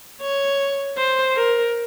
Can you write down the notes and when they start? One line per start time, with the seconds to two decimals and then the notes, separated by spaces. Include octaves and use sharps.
0.21 C#5
0.97 C5
1.35 A#4